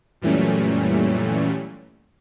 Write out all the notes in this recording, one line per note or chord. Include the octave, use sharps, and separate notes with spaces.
F#2 A#2 E3 G3 A3 C#4